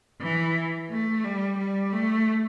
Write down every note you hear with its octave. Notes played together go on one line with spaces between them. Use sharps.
E3
A3
G3
G3
A3